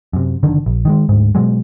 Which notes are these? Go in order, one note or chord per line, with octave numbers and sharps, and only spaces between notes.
F#2 C3
F#1 D3 D#3
A#1
D#3 F#3 G#3
D2 G#2
B2 F#3 G#3